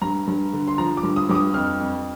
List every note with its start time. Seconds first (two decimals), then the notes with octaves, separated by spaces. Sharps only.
0.01 G2 A#5
0.27 G2
0.53 D3
0.67 C6
0.78 F3 A#5
0.97 D6
1.03 G2
1.16 D#6
1.29 G2 D6
1.35 D#6
1.54 F2 F6
1.80 F2